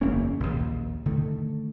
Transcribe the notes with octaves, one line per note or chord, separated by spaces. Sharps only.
F#1 E2 A#3 C#4
A#1 D#2
D3 D#3 A3